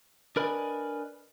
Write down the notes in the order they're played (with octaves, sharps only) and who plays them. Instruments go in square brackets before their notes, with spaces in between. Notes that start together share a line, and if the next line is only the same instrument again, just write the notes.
[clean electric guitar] D4 A#4 B4 D5 D#5 G#5